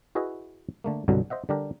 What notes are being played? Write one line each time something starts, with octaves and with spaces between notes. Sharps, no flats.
E4 F#4 G#4 B4 D#5 E5
D3 A3 A#3
C2 G2 B2 D3 F#3
C5 D#5 E5 F#5
D3 G3 D4 G4 A#4